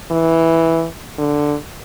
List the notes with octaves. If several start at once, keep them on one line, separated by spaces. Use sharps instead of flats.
E3
D3